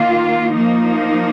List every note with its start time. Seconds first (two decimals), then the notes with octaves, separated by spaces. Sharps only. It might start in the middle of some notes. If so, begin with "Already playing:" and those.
Already playing: D#3 A#3 F4
0.54 F3 A#3 D#4